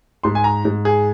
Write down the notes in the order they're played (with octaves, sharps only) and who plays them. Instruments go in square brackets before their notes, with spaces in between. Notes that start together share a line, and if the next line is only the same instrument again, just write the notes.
[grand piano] G#2 C6
G#5
A#5
G#2
G#4